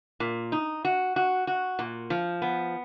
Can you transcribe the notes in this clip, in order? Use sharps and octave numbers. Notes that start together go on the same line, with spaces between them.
A#2
D#4
F#4
F#4
F#4
A#2
F3
B3